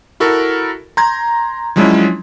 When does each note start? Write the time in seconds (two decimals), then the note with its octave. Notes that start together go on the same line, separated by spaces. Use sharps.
0.20 E4 F#4 A4 A#4
0.97 A#5 C6 G6 G#6
1.76 F3 F#3 G#3 C#4 D4 E4